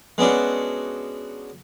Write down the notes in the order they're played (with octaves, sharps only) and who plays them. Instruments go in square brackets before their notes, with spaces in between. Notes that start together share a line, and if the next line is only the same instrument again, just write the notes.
[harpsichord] G#3 B3 C#4 D4 F#4